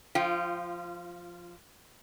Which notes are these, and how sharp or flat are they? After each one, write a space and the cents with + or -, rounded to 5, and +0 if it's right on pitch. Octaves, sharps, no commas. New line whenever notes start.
F3 +0 F4 -25 G5 -10